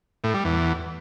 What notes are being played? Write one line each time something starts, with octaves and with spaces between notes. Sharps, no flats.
A2
G3
E2